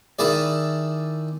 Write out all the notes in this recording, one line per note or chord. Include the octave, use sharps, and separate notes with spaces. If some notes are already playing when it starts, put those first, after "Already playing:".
D#3 E4 G#4 D5